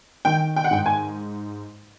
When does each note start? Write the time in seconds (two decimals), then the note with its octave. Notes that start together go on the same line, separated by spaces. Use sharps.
0.25 D#3 G5
0.56 G5
0.64 F#5
0.71 G#2 G5
0.86 G#5